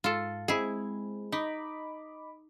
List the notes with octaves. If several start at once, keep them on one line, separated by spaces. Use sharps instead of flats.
G#2 F4 A4
G#3 C4 E4 G#4
D#4 D#5 B5 D6